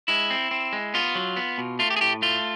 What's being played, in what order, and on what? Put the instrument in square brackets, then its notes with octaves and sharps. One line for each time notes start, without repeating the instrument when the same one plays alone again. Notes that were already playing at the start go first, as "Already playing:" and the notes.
[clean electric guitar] G#3 E4
C4
C4
G#3
B3 F4
F#3
B3
B2
A3 F4
G4
G#4
A2 G4
A3 F4